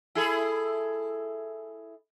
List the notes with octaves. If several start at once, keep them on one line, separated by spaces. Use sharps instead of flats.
E4 G#4 A4